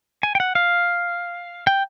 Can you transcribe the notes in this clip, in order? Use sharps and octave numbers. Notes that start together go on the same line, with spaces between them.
G#5
G5
F#5
F5
G5